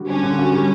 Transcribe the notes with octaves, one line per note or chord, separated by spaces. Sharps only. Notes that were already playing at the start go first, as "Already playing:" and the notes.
Already playing: D3 G3 F#4
C#4 D4
D3
F#4
G3